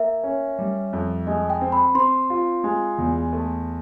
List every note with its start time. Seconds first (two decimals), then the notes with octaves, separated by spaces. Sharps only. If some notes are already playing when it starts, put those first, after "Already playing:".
Already playing: A#3 E5
0.24 C#4
0.59 G3
0.93 F2
1.27 G#3 D#5
1.50 G5
1.61 C4
1.72 B5
1.95 C4 C6
2.30 F4
2.64 G#3
2.98 E2
3.33 A3